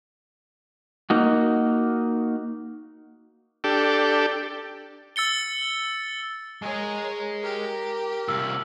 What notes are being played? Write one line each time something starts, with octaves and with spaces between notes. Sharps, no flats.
A#3 D#4 F#4
D4 G4 A4
E6 A6 C#7 G7
G#3 G#4 A#4 C#5
G4 A#4
C2 F4 E6